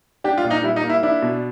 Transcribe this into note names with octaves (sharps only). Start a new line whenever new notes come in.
D4 G4
F4
A#2
D#4
G3 E4
D#4
A#3
E4
D4 E4
B2